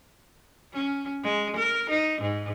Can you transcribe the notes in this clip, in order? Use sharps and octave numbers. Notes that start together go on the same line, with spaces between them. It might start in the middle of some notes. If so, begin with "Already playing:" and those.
C#4
G#3
A#4
D#4
G#2